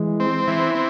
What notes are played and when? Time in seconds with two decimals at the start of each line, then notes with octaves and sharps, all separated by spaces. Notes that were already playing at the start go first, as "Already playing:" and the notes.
Already playing: E3 G#3
0.20 C4
0.47 E3
0.75 C4